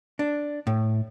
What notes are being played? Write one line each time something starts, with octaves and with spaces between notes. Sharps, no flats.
D4
A2